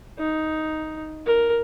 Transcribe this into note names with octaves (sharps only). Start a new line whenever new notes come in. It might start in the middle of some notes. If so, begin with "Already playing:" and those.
D#4
A#4